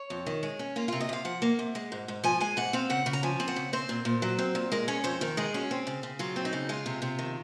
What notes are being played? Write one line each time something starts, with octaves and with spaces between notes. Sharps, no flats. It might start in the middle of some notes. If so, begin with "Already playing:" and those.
Already playing: C#5
F2
D#3
G#3
C#4
A#3 F4
C3 F4
D#5
C3 F5
F3 F#5
A#3
C3
G#3
G#2
G#2
F3 G#5
G#3 G#5
G#2 F#5
C4 F5
C#3 F#5
C#3
A#5
F3 G#5
C4
F#5
C#3
C4 C5
A#2
A#2
F#3
C4
A#2
G#3 A#4
C#4 C#5
F2 C5
D#3 A#4
G#3 G#4
C#4 F#4
C4
C#3
C#3
F#3 F4
C4
D#4
C#3
G#3 F4
C3
C3
D#3